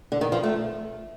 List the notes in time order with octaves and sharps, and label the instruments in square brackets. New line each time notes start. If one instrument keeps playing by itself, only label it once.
[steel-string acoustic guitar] D3
D#3
F3
A3